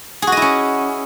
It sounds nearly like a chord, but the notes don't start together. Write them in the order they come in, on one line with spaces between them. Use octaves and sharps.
G#4 F#4 D#5 E4 C#4